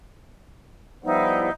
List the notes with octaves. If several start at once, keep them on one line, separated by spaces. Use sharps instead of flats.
F3 G3 B3 D#4 E4